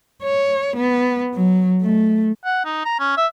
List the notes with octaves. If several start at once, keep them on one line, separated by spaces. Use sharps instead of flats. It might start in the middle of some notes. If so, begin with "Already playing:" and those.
C#5
B3
F#3
A3
F#5
D#4
A#5
C#4
E5